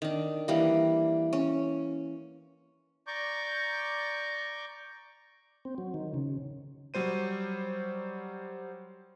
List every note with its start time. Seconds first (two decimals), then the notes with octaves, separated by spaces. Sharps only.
0.02 D#3 D4
0.48 E3 G3 A#3
1.33 C#4
3.07 D5 A#5 C#6 D6 G6
5.65 C4
5.78 F#3
5.94 D#3
6.14 C#3
6.94 F#3 G3 C5 D#7